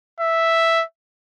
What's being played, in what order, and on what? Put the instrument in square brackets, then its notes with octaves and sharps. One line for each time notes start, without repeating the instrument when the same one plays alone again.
[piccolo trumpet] E5